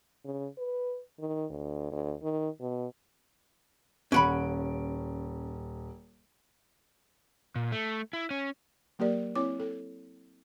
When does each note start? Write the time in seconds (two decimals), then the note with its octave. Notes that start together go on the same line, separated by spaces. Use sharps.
0.25 C#3
0.58 B4
1.19 D#3
1.50 D2
1.92 D2
2.22 D#3
2.60 B2
4.12 D#1 C#4 F#5 B5 D7
7.56 A#2
7.72 A3
8.13 E4
8.31 C#4
8.99 F#3 A#3 G4 A#4 D5
9.35 C4 E4 C#5 D6
9.60 A4